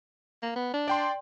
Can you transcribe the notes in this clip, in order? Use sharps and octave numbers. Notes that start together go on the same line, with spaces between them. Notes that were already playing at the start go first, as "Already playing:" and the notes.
A#3
B3
D4
D5 G5 C6